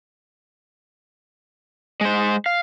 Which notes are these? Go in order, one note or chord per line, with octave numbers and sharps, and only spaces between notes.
G#3 C5
F5